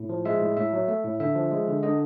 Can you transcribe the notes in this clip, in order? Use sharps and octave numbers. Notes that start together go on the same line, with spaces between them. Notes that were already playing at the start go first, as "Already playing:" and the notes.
Already playing: A2
F3
G#3 E5
A2
A2 E5
F#3
A3
A2
D3 E5
F3
G#3
D3
D3 D#5